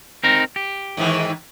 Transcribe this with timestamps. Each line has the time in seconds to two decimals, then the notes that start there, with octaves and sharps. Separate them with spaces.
0.24 C4 D#4 A#4
0.56 G4
0.97 G#2 D#3 E3